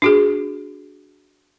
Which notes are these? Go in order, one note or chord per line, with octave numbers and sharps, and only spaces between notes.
D4 F#4 G#4